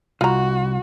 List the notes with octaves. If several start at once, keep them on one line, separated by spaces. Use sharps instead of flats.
C2 F4 F#4 A#5